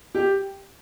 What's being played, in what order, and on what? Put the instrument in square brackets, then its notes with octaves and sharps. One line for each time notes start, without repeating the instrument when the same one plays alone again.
[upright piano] G4